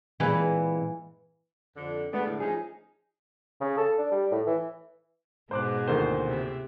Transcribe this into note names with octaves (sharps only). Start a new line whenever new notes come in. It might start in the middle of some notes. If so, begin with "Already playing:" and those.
A#2 E3 G#3 C4 B4
F2 D3
G#3 A3 B3 D4
A2 D3
F3 C#4 D#4 G#4
C#3
A4
D4
G3
A2
E3
G#2 B2 G#3 C5 D6 F#6
D2 A#2 D#3 C5
C3 E4